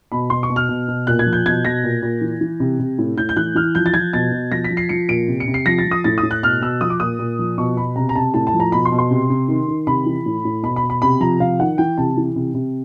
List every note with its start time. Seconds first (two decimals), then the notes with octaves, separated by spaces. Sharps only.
0.12 B2 B5
0.30 B2 C6
0.43 C#6
0.50 B2
0.56 F6
0.69 B2
0.88 B2
1.07 A#2 F#6
1.19 G#6
1.27 F3
1.33 G6
1.46 B2 G#6
1.65 B2 A#6
1.84 A#2
2.02 A#2
2.21 E3
2.41 E3
2.60 C3
2.79 C3
2.98 A2
3.17 A2 G6
3.29 G6
3.37 E3 F#6
3.55 E3 F6
3.75 F3 G6
3.86 A6
3.94 F3 G#6
4.13 B2 A6
4.32 B2
4.52 F3 A#6
4.64 B6
4.71 F3
4.77 C7
4.89 F3 C#7
5.09 A#2 D7
5.28 C3
5.40 C#7
5.47 C3
5.54 C7
5.66 F3 A#6
5.78 A6
5.85 F3
5.91 D#6
6.04 A2 A6
6.18 D#6
6.23 A2
6.31 F#6
6.43 B2 F6
6.62 B2 E6
6.81 F3 D#6
6.90 D6
7.00 A#2 D#6
7.19 A#2
7.39 F3
7.58 B2 C#6
7.77 B2 B5
7.96 C3 A#5
8.09 A#5
8.15 C3 A5
8.34 A2 A5
8.47 A5
8.53 F3
8.60 A#5
8.72 B2 B5
8.85 C6
8.92 B2
8.98 C6
9.11 C3
9.30 C3
9.48 D#3
9.68 D#3
9.87 C3 B5
10.06 E3
10.26 A2
10.45 A2
10.63 B2 B5
10.76 B5
10.83 B2
10.90 B5
11.02 C3 B5
11.21 F3 A#5
11.40 C3 F5
11.59 D#3 F#5
11.78 E3 G5
11.97 C3 A5
12.17 E3
12.36 C3
12.54 C3